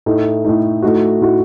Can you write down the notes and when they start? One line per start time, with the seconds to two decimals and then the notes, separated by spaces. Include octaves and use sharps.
0.06 A2 A3 D#4
0.44 A2 A3 D#4
0.82 A2 A3 D#4 F#4
1.21 A2 A3 D#4 F#4